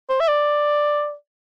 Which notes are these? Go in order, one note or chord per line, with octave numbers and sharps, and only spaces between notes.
C5
E5
D5